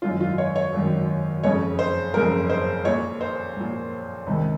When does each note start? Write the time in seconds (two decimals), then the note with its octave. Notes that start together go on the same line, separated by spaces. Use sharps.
0.02 G#1 F4
0.05 F#2 D#3
0.20 F4
0.38 C#5
0.56 C#5
0.73 G#1 F#2 D#3
1.44 F#1 F2 C#3 C#5
1.79 C5
2.14 F#1 F2 C#3 A#4
2.50 C5
2.85 A#1 A#2 C#5
3.21 C5
3.56 A#1 A#2
4.27 C#2 C3 D#3